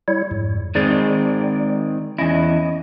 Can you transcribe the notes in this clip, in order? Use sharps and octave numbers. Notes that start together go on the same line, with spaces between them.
G3 E4 C#5
F2 G#2
D#3 G#3 C4 D5
E2 C#4 E4 D#5